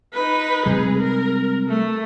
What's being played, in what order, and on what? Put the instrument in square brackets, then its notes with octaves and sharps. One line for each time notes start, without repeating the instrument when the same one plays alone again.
[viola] D#4 B4
[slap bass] C3 G3 G#3 [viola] G#4
[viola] A#4
A3